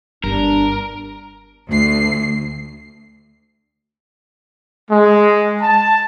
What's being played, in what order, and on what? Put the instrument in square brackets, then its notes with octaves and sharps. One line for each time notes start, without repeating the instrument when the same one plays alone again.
[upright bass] G1 [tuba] G2 [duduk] D4 [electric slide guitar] A#4
[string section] D2 C7
[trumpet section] G#3
A5